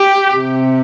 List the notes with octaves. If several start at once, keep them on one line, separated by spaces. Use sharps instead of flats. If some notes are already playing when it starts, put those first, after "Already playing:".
Already playing: G4
C3